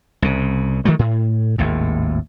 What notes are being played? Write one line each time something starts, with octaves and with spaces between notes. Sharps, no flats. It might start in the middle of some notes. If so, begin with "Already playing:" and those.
C2 C#3
D#3 E3 F#3 A3
A2
G#1 D#2 A2